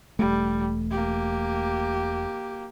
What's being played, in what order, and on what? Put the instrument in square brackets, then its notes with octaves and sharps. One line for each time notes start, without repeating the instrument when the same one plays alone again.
[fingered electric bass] E1 A3 [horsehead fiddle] G3
[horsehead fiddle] A#3 G4